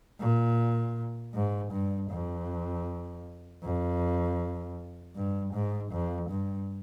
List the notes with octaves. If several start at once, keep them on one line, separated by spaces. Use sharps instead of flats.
A#2
G#2
G2
F2
F2
G2
G#2
F2
G2